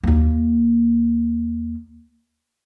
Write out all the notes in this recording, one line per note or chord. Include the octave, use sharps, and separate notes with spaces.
D#2 A#3